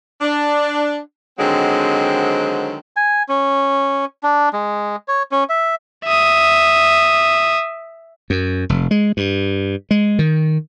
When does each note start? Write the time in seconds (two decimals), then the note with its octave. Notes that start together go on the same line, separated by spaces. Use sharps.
0.21 D4
1.39 D3 D#3 F#3 G#3 C4
2.96 G#5
3.29 C#4
4.23 D4
4.53 G#3
5.08 C#5
5.32 C#4
5.49 E5
6.05 E5 D#6
8.30 F#2
8.69 F1
8.91 G#3
9.17 G2
9.91 G#3
10.19 D#3